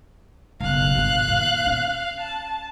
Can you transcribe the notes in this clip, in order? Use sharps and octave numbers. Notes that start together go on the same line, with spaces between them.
F#1 B1 F5 F#6
G1 B2
A#2 D#3
C#4
A5